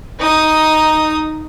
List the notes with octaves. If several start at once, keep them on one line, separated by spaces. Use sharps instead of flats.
D#4 D#6